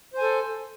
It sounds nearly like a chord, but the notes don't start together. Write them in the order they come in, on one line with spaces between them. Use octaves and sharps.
C5 G#5 A4